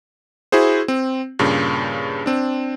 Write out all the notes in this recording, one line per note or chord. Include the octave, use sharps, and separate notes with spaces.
E4 F#4 G#4 C5
C4
G2 A#2 C#3
C4 D4